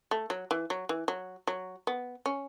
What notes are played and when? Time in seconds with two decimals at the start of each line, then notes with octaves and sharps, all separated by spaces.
0.11 A3
0.30 F#3
0.51 E3
0.70 F#3
0.89 E3
1.08 F#3
1.47 F#3
1.87 B3
2.26 C#4